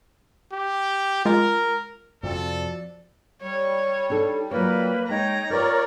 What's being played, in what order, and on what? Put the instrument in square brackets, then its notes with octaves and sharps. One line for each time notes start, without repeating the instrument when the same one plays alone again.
[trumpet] G4
[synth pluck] G#3 F4 [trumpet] A#4
[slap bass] F2 C3 [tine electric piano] F3 F#4 [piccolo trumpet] A4 [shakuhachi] D5
[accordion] G3 [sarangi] C#5
[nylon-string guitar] D4 D#4 A4
[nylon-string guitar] F#3 F4 C#5 [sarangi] A#3 [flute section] B4
[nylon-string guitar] G#3 [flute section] D#4 C#5 G5 [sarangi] A#5
[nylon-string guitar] F4 G4 B4 [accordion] A#4 C#5 D5 [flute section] D6